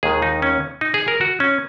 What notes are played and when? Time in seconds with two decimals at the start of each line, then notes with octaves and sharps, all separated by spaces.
0.03 D#2 D#3 G#3 G#4
0.22 D#4
0.42 C#4
0.81 D#4
0.94 G#4
1.08 A#4
1.21 F#4
1.40 C#4